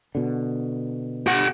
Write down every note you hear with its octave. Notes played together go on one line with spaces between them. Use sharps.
B2 D3
G4 F#5